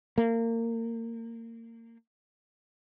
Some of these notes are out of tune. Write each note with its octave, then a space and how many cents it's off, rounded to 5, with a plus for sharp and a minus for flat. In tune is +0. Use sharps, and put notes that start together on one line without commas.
A#3 -25